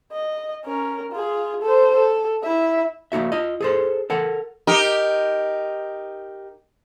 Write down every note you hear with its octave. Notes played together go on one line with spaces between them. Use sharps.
D#5
C#4 A#4
F4 G#4
A4 C5
A4
E4 E5
A#3 D#4 F#4 E5
F4 D#5
G#4 A4 C5
A4 A#4 F#5
D#4 G4 A#4